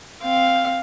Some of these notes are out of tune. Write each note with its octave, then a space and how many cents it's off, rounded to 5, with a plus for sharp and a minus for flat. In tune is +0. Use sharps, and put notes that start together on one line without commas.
C4 +0 F5 +0